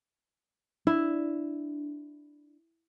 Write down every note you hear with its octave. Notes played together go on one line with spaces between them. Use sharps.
D4 E4